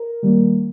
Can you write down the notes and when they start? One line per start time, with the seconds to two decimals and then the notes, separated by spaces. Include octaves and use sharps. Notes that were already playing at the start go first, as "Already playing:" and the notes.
Already playing: A#4
0.23 D#3 G3 A#3